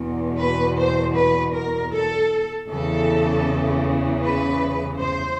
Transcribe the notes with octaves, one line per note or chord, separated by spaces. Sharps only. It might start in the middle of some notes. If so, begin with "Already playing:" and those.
Already playing: E2 B2
B4
C5
B4
A#4
A4
E2 C#3 E3 A4
B4
C5